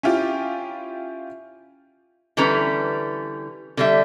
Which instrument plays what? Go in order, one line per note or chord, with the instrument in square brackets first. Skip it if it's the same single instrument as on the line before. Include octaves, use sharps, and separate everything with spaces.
[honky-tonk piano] C#4 E4 F4 G4
[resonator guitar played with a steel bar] D3 E3 G3 C#4 B4 A#5
D3 G3 E5